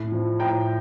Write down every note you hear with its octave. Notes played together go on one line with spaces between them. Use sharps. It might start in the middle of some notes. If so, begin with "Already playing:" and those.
Already playing: A2
F3
A2 G5 A#5